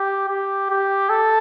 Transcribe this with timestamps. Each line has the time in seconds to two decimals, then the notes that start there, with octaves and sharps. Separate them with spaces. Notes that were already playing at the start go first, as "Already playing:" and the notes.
Already playing: G4
0.29 G4
0.70 G4
1.10 A4